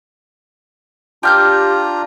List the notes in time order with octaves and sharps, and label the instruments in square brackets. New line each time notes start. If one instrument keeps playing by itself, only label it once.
[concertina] D4 F4 A#5 [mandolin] G4 F6 G6